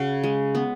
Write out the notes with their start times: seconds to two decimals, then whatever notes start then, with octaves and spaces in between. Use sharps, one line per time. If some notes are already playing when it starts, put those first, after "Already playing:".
Already playing: C#3 F#4
0.24 G#3
0.55 B3